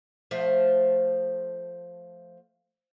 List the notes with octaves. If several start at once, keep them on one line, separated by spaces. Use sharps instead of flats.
F3 A3